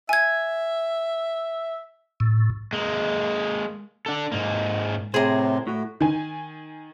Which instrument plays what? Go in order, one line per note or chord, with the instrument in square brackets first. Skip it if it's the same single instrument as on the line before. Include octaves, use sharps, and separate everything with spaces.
[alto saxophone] E5 [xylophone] G#5 G#6
[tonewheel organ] A2
[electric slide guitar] G#3 A#3
D4 A4
G#2 A#3
[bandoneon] A2 C3 [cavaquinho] G#4 A#4 [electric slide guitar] C5
[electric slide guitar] A2 [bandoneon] F#4
[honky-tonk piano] D#3 G#5